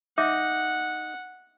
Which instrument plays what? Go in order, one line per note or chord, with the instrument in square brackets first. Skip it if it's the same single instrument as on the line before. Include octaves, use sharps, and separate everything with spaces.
[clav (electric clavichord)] D#4 [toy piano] E5 D6 [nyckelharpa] F#5